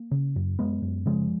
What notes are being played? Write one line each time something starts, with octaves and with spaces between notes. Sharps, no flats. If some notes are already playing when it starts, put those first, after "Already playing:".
Already playing: A#3
C#3
F#2
F#2 G#3 B3
F#2
C#3 F3 G#3